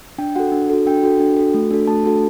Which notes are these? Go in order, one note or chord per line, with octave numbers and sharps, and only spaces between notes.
D4 G5
F#4 A4 F#5
D4
F#4 A4
D4 G5
F#4 A4
D4
F#4 A4
A3
D4 F#4 A4
A3 A5
D4 F#4 A4